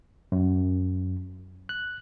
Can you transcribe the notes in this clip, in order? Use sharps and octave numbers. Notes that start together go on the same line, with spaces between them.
F#2
F#6